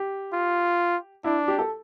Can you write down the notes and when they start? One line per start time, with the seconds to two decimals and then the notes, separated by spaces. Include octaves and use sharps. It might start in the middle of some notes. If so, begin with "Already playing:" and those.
Already playing: G4
0.33 F4
1.24 D4 E4
1.48 G4
1.58 A4